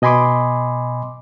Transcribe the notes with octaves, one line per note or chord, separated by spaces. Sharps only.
B2 D#5 G#5 B5 C6 D6